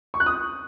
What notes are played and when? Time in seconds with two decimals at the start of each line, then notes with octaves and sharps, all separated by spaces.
0.14 C#6
0.20 F#6
0.26 D#6